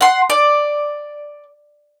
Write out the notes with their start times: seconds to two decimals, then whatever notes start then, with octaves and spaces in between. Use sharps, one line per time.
0.01 F#5 C6
0.30 D5